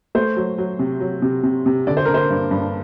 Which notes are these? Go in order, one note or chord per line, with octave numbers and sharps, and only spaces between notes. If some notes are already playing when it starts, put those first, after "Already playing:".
A3 C5
F#3
F#3
C3
F#3
C3
C3
C3
D3 D5
C5
D3 A#4
C5
G2
G2